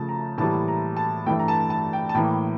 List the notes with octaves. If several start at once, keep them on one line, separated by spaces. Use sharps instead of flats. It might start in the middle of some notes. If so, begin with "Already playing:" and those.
Already playing: C#3 F3 A3 A5
A#5
A2 E3 G3 A#3 A5
A#5
A5
G2 E3 A3 G5
A#5
A5
A5
G5
A5
A2 E3 A#3 G5